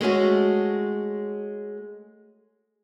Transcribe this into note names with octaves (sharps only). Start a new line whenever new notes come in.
G#3 A3 C#4 F#4